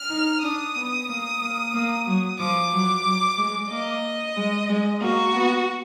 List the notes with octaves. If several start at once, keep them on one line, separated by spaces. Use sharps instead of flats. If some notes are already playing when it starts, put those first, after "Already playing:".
Already playing: F6
D#4
D4 D#6
B3
A#3
A#3
A#3
F#3
F3 D6
F#3
F#3
G#3
A#3 D#5
G#3
G#3
A#3 F#4
B3